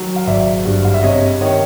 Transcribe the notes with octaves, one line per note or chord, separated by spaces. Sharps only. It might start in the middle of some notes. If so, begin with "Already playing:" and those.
Already playing: D#3 F#3
F5
G#1 D5 E5
G2
F5
E5
C3 C#5 D#5
D#3 C#5 D#5